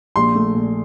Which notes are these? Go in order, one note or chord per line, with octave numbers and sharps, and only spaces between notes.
A#1 C6
A3
A#2